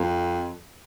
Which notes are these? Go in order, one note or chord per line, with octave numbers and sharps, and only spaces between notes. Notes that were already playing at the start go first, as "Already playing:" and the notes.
Already playing: F2